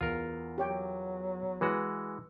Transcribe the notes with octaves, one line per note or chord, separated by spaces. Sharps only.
E2 F4 A#4
F#3 G4 C#5 G5
E3 G#3 F#4 B4